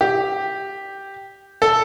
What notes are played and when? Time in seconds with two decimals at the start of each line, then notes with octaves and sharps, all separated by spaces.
0.01 G4
1.62 A4